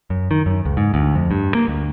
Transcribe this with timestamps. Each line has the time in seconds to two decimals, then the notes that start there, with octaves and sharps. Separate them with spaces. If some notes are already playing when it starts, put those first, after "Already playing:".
0.10 F#2
0.31 D#3
0.46 F#2
0.65 C#2
0.77 G#2
0.94 D2
1.15 F2
1.31 G2
1.55 A#3
1.68 D2